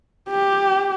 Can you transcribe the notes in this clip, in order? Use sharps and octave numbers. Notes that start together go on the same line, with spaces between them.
G4